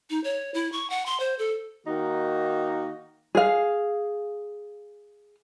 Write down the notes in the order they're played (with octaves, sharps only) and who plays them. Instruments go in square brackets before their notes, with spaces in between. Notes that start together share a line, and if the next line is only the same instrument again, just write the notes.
[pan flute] D#4
C#5
E4
C#6
F#5
C6
C5
A4
[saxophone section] D#3 A#3 D#4 F#4
[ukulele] G#4 F5